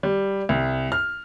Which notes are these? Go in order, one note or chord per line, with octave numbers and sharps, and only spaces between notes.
G3
C2
F6